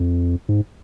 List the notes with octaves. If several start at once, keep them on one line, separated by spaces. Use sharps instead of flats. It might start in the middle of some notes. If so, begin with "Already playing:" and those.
Already playing: F2
G#2